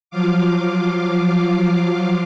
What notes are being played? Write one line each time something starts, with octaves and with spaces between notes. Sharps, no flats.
F3 F#3 F4 F5 D6